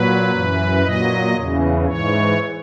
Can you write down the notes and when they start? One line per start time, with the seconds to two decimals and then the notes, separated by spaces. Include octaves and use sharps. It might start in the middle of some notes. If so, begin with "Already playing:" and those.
Already playing: A#2 F#3 B4
0.31 F#2 E3
0.82 A#2 F#3 D#5
1.35 E2 C#3 E3
1.86 G#2 E3 C#5